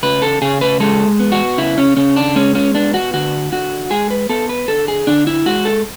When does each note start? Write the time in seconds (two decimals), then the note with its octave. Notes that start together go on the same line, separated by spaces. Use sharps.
0.03 C#3 B4
0.22 A4
0.42 C#3 G#4
0.61 B4
0.80 G#3 A4
1.20 B3
1.32 F#4
1.58 C#3 E4
1.78 C#4
1.97 C#3 C#4
2.16 D4
2.35 G#3 C#4
2.55 C#4
2.74 B3 D4
2.94 F#4
3.13 D3 F#4
3.52 D3 F#4
3.90 G#3 G#4
4.11 B4
4.29 B3 A4
4.49 B4
4.68 D3 A4
4.88 G#4
5.07 D3 D4
5.27 E4
5.46 G#3 F#4
5.65 A4